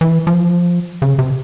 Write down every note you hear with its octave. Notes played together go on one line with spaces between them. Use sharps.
E3
F3
C#3
C3